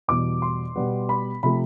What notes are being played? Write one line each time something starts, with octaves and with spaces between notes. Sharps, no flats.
E2 B2 G3 D6
C6
B2 G3 B3
B5
C3 F3 A3 B5